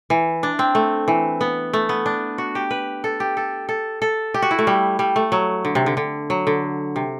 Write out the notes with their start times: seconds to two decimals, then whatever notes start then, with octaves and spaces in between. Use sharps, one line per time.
0.10 E3
0.43 D4
0.59 C4
0.75 A3
1.08 E3
1.41 B3
1.73 A3
1.89 B3
2.06 D4
2.38 F#4
2.55 G4
2.71 B4
3.04 A4
3.20 G4
3.37 A4
3.69 A4
4.02 A4
4.34 G4
4.42 F#4
4.51 E4
4.59 A3
4.67 G3
4.99 G3
5.16 A3
5.32 F#3
5.65 D3
5.75 C3
5.86 D3
5.97 D3
6.30 F#3
6.47 D3
6.96 C3